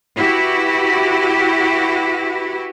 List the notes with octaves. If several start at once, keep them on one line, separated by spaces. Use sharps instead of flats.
E4 F#4 G4 B4